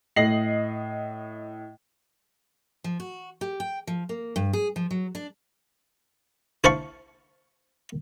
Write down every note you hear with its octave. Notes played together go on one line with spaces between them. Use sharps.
A2 D#5 A#6 C7 F#7
F3
F#4
G4
G5
F3
A#3
G2
G#4
F3
F#3
D4
E4 C5 F5 A5 B5 C#6